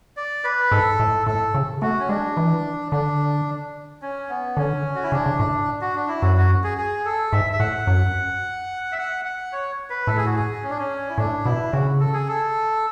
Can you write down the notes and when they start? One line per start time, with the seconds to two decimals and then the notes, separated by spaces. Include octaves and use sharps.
0.17 D5
0.44 B4
0.71 G#2 A4
1.00 A2
1.27 A2 A4
1.55 C#3
1.82 A3 F#4
1.99 C#4
2.09 G#3 D4
2.37 E3
2.92 D3 D4
4.02 C#4
4.29 B3
4.57 D3 C#4
4.95 F#4
5.04 E4
5.12 C#3 D4
5.26 C#3
5.39 A2
5.81 F#4
5.95 D4
6.08 E4
6.22 F#2 F#4
6.37 F#4
6.64 G#4
6.78 G#4
7.05 A4
7.32 G#2 E5
7.53 E5
7.59 A2 F#5
7.87 F#2
8.92 E5
8.98 F#5
9.25 F#5
9.52 C#5
9.90 B4
10.07 A2 A4
10.17 G#4
10.26 F#4
10.36 G#4
10.63 C#4
10.70 D4
10.78 C#4
11.10 E4
11.18 A2 D4
11.45 B2 E4
11.72 C#3 F#4
12.00 A4
12.14 G#4
12.28 A4